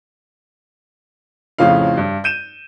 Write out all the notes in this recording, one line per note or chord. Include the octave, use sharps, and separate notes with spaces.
F2 A2 C#3 F4 F5
G2
G6 D#7 E7